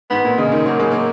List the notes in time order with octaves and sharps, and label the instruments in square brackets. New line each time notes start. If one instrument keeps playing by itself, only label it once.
[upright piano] G#2 [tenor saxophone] B3
[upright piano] A#2
[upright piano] C#3 [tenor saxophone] G#3
[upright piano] D#3
[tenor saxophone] F#3 [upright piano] A#3
[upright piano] G#3
A#3